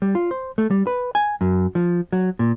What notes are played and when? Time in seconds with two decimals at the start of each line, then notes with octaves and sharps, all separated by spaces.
0.02 G3
0.15 F4
0.31 C5
0.58 A3
0.71 G3
0.87 B4
1.15 G#5
1.41 F#2
1.75 F3
2.12 F#3
2.39 A#2